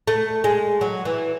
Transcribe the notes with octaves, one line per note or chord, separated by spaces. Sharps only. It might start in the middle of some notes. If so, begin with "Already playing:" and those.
A3
G#3
F#3
E3